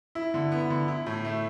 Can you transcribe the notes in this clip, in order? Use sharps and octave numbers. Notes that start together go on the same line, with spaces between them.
E4
D3
B3
D3
E4
A2
A3